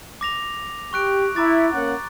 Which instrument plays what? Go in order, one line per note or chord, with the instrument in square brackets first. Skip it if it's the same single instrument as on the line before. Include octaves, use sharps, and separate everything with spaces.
[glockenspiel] D6 A#6 F7
[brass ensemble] G4 [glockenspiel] C#6 F#6 D7
[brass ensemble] E4 [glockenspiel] A#5 D6 A6
[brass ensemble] A#3 C#4 F#5